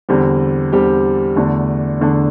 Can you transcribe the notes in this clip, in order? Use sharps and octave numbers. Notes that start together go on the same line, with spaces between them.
E2 D3 G3 C4 G4
E2 D3 G3 C4 G4
E2 D3 A3 D4
E2 D3 A3 D4